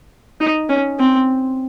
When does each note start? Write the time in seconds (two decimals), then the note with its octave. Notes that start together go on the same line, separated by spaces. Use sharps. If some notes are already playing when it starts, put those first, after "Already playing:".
0.40 D#4
0.69 C#4
1.00 C4